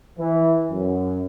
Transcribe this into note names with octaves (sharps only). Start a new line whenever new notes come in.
E3
F#2